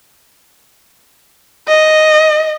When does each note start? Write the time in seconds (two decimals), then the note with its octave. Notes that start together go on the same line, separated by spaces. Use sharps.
1.68 D#5